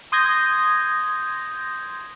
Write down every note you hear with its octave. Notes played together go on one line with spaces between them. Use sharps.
C6 D#6 G6 G#6 A#6